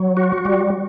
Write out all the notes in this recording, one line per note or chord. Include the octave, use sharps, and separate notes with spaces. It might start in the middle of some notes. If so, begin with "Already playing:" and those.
Already playing: F#3
F#4
G3